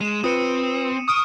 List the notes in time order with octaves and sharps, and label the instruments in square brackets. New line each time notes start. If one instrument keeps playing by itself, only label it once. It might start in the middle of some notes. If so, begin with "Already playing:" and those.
[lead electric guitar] G#3 [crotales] D#7 E7
[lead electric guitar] C4 [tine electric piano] F4 B4 [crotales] D#6 C#7 D#7
[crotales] C#6 F6 D7 [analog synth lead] D#6